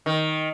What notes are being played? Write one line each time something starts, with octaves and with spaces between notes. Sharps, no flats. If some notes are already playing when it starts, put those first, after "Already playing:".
D#3